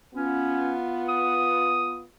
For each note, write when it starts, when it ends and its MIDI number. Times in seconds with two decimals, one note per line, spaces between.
0.15 2.04 59
0.15 0.74 61
0.15 2.04 65
1.09 2.00 87